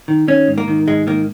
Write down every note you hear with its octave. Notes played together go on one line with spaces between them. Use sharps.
D#3
D#3 C#4
G#2
A#3
D#3
G#2 G#3
D#3 A#3